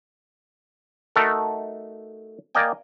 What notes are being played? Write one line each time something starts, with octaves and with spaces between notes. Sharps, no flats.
A3 D#4 F#4 A4 A#4
A#3 A#4 D5 D#5 G5 G#5